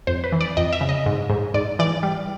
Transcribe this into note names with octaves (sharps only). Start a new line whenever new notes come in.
F2 C5
B4
E3
D5
F2 D#5
E5
C#3
D#5
G#2
G#2
G#2 D5
E3 D5
G3